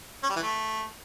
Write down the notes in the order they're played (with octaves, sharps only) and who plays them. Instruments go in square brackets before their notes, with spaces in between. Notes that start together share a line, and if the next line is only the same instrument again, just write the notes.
[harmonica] C#4
G3
E3
A3